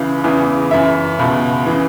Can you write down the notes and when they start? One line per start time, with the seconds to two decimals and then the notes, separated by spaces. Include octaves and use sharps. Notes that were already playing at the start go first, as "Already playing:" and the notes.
Already playing: C#2 C#3 E3
0.24 E2 C#3 E3
0.71 F#2 E3 E5
1.19 C#2 B2
1.66 C#3 E3